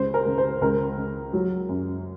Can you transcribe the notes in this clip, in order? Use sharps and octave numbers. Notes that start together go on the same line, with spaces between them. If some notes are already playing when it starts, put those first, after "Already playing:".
Already playing: C#2 C5
A#4
C#3
C5
C#2 A#4
C#3
F#3
F#2